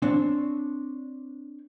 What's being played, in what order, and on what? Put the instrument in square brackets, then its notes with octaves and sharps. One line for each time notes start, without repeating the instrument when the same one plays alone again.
[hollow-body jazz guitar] C4 D4 C#5